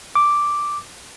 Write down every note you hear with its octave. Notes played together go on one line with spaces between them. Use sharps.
D6